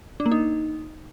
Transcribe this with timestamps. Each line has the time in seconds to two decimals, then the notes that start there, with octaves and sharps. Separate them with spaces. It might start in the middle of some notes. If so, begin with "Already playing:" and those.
0.20 D4
0.26 A#3
0.31 D#4